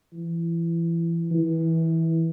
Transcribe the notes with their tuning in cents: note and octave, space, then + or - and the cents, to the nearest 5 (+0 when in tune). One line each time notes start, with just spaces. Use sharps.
E3 +25
E3 -20